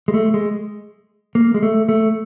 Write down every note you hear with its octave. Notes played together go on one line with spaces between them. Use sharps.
G#3
A3
G#3
A#3
G#3
A3
A3